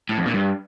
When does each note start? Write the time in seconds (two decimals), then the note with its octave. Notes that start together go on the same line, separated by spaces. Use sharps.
0.09 A2
0.18 F2
0.26 A#2
0.34 G2